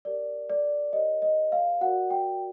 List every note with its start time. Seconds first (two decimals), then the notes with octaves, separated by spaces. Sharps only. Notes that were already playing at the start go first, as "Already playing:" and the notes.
0.05 G4 A#4 C#5 D5
0.50 D5
0.93 G4 A#4 C#5 D#5
1.22 D#5
1.52 F5
1.81 F#4 A#4 D5 F#5
2.10 G5